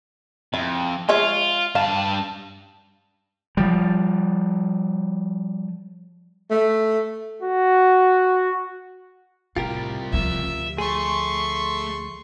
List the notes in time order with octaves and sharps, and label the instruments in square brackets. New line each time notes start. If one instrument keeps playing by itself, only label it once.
[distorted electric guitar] F2 [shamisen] E4
[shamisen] G#3 C#5 E5 [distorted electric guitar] F4
[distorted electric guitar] G2 A5 [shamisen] F5
[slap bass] F3 G3
[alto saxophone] A3
[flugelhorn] F#4
[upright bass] A2 [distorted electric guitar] C3 G3 [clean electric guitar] F4 G4 A#4
[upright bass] D2 F3 [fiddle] E5
[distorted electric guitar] A3 [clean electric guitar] G#4 [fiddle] C6 C#6